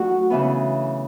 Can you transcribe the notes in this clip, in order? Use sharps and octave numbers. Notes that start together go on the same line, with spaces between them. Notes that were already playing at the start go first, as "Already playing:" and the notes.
Already playing: F#3 A3 D4 F#4
C#3 E3 B3